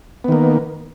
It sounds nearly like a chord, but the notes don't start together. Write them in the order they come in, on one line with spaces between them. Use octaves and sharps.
B3 D#3 A#3